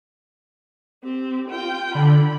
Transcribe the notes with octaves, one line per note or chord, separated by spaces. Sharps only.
C4 G4
F4 G5
D3 B5